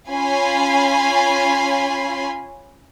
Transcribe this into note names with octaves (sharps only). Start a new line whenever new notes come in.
C#4 F4 G#5 B5 C6